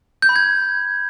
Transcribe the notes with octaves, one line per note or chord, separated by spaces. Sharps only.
G6
B5
G#6